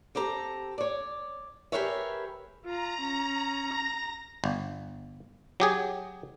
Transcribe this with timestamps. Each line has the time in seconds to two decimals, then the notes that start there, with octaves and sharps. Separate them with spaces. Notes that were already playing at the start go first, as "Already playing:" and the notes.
0.15 C4 G4 A4 A#5
0.78 C#5 D5
1.72 G4 G#4 A#4 B4 C#5 E5
2.65 F4 A#5
3.02 C#4
3.73 A#6
4.44 G1
5.60 F#3 G4 G#4